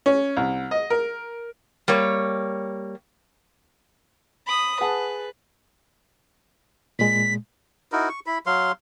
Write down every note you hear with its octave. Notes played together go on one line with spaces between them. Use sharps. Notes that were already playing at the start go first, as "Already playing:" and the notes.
C#4
C2
D#5
A#4
G3 A#3 C#5
B5 D#6
G#4 B4 F#5 A5
A#2 G#3 B6
D#4 E4 F#4 A#4
C#6
E4 B5
F#3 F5 C6